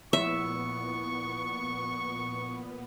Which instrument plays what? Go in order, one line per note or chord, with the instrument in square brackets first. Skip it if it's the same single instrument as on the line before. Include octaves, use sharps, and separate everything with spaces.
[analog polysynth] A#2 B3 [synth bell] F3 E4 [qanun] E5 [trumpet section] C#6